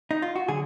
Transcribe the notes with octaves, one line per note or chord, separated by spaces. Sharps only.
D#4
F4
F#4
D3 F#3 G#4